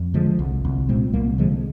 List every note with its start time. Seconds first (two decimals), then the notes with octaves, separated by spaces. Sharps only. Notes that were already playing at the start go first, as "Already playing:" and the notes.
Already playing: F2
0.14 D3 F3 G#3
0.39 C2
0.65 C2
0.89 A#2 G#3 C4
1.13 C2 G3 A#3
1.38 D3 F3 G#3